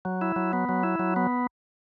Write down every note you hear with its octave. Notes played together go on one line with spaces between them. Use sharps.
F#3
E4
F#3
B3
F#3
E4
F#3
B3